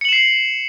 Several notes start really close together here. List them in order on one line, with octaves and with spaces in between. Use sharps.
C#7 F#7 E7 C7